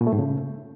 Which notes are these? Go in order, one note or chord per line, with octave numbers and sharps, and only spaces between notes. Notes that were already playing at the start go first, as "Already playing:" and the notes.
A#2
A3
G#2
C#3